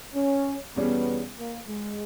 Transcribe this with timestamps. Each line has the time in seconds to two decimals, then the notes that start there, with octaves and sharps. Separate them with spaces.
0.15 C#4
0.75 E2 B2 G3 B3 C#4 G#4
1.37 A#3
1.67 G#3